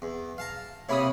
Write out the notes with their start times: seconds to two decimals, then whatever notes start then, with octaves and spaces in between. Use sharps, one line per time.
0.02 E2
0.38 F5 A5 A#5
0.89 C3 A#3 E4 C#5 B5 D#6